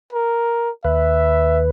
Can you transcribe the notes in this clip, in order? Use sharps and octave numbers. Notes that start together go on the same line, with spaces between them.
A#4
D#2 B4 E5